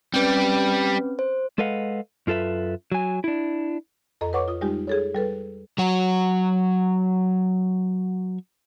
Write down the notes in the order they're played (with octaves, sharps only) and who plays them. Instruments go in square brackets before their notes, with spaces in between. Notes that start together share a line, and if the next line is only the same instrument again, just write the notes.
[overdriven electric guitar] G3 [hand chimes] C4 C#4 B4
[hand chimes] C5
[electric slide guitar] G#3 A4 B4 D#5 F5 F#5
F#2 F4 A4 B4 E5
F#3 G#5
D4 E4
[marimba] F2 A4 D#5 A#5
B4 C#5 F#5 C#6 D6
F4 D#6
G3 G#3 D#4 F4 G4
G#4 A4 C#5
G3 A4 B4
[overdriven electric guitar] F#3 F#4